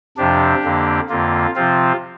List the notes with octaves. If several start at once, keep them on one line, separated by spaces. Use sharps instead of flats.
F2 C3 F3 D4 G4
F2 D3 A#3
F2 D3 A#3 F4
C3 F3 C4 F4